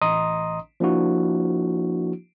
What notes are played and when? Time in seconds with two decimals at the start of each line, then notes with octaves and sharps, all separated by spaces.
0.02 A1 D#5 A#5 C6 D#6
0.80 F3 A#3 D4 E4 F#4